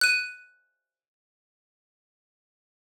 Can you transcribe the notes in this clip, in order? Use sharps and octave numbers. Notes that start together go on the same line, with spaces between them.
F#6 D#7